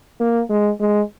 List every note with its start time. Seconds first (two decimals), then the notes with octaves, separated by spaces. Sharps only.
0.20 A#3
0.50 G#3
0.80 G#3